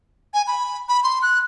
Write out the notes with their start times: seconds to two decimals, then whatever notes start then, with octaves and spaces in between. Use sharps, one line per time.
0.34 G#5
0.47 B5
0.89 B5
1.04 C6
1.22 F#6